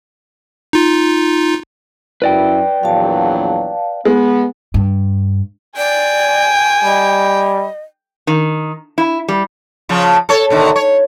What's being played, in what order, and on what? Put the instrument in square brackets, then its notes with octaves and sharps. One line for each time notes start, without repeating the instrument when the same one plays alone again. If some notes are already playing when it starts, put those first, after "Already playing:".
[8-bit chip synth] D#4 F4
[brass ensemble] F#2 E4 [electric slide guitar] B4 D5 G5
[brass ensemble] A#1 E2 F#3 [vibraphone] F5 A5
[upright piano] G#3 [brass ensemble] B3
[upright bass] G2
[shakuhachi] D5 [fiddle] G5 [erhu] G#5
[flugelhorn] G3 [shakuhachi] D#5
[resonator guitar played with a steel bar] D#3
E4
G3
[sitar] C#3 F3
A4 C#5
B2 D3 D#3
C#5